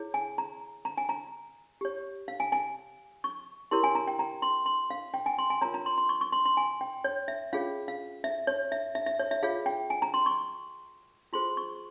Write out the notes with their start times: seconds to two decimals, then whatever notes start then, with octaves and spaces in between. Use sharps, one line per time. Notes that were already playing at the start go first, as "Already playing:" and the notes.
Already playing: E4 G#4 C#5
0.14 G#5
0.38 A#5
0.85 A#5
0.98 G#5
1.09 A#5
1.81 G4 C#5
2.28 F5
2.40 G#5
2.52 G#5
3.24 C#6
3.71 E4 G4 A#4 C#5 C6
3.84 G#5
3.95 A#5
4.08 G5
4.19 A#5
4.42 C6
4.66 C6
4.90 F5
5.14 G5
5.26 G#5
5.38 C6
5.50 G#5
5.61 F4 A#4 C#5 A#5
5.74 A#5
5.86 C6
5.98 C6
6.09 C#6
6.21 C#6
6.33 C6
6.46 C6
6.57 G#5
6.81 G5
7.04 C#5
7.28 E5
7.53 C#4 F4 G#4 C#5 F5
7.88 F5
8.24 E5
8.47 C#5
8.72 E5
8.95 E5
9.06 E5
9.19 C#5
9.31 E5
9.43 F4 G#4 C#5 F5
9.66 G5
9.90 G#5
10.02 A#5
10.14 C6
10.26 C#6
11.33 F4 G#4 C5 C6
11.57 C#6